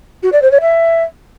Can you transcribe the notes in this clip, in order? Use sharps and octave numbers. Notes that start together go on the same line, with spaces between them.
F#4
D5
C5
C#5
E5